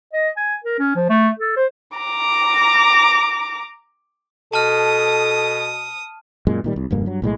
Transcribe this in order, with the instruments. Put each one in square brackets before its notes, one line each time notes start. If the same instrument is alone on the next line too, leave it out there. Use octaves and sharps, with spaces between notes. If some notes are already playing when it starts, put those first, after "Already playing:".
[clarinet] D#5
G#5
A#4
C#4
F3
A3
A4
C5
[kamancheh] A#5 D6
[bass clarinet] B2 [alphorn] A4 [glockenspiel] A5 F6 [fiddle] D#6
[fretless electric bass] F#2 A#2 G#3
A#2 D#3 G3
C2
F1 D2 G2 A#3
G2 F#3
B1 A2 G3 G#3